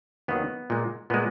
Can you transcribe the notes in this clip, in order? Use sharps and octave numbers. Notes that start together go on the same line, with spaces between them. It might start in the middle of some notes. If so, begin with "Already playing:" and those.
D#2 D#3 F#3 B3
A#2 G#3
A#2 G#3 B3